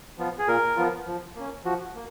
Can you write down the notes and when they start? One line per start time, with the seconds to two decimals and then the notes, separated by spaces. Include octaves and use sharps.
0.18 F3 B3 F4
0.38 G#4
0.47 A#2 A#4
0.77 F3 B3 F4
1.07 F3
1.35 A#3 C#4
1.65 F3 F#4
1.95 A#3